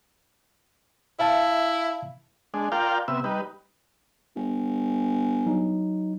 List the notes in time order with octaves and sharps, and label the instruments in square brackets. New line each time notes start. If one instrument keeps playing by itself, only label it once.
[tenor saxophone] E4 [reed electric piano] E5 F5 A5
[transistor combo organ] G#3 D4
F4 A#4 D5 F5 G5
C3 B3 E5
G3 D#4 B4
[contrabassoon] G1
[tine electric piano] F#3 D#4